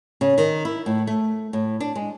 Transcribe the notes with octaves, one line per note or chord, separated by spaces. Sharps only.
C#3
D#3
E4
A2
A3
A2
D4
G#3